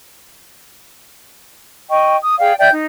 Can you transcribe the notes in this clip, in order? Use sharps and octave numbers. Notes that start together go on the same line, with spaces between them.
D#5 G5 C#6
D#6
G#4 D5 F5 G5
D5 E5 G5 G6
D#4